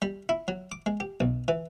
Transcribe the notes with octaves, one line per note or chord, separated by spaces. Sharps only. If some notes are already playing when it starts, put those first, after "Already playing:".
G3
E4
F#3
D6
G#3
G4
B1
E3